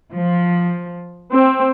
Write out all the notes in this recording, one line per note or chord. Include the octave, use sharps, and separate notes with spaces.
F3
C4